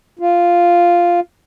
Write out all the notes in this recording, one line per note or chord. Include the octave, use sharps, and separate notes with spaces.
F4